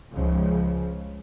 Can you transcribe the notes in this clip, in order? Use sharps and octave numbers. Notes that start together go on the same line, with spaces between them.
C#2 C#3 F3